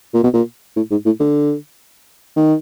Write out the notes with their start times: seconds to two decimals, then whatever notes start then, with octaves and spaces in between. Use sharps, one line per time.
0.14 A#2
0.23 B2
0.33 A#2
0.76 A2
0.91 G#2
1.06 A2
1.20 D3
2.37 D#3